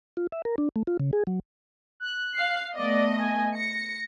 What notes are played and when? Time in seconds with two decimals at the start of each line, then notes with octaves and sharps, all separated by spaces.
0.17 F4
0.32 E5
0.45 A#4
0.58 D4
0.76 A3
0.87 F4
1.00 C#3
1.13 G#4
1.27 F#3
2.00 F#6
2.35 F5 C7
2.76 A3 B3 D5 D#5
3.18 G#5
3.55 A#6 C#7